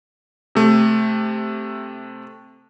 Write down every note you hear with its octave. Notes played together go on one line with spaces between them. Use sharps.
C3 A3